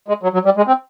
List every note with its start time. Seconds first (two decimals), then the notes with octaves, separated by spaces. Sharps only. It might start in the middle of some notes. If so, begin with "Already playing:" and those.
0.08 G#3
0.23 F#3
0.33 F#3
0.45 G3
0.57 G#3
0.67 C4